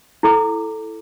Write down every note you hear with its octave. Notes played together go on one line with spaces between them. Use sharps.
E4 A4 D6